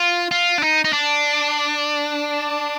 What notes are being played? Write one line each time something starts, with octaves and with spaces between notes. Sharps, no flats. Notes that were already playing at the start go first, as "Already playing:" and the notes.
Already playing: F4
F4
D4
D#4
D#4
D4